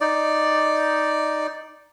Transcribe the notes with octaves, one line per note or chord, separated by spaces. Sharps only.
D#4 D5